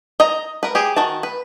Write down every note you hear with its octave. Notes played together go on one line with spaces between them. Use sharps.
D#5 A#5
A#4 B4
G4 G#4
D#3 F#4 A5
B4